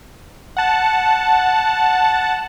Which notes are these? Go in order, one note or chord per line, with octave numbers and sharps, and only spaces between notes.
F#5 A5